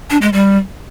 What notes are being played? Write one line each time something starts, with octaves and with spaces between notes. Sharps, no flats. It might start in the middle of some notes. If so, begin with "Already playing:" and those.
D4
G#3
G3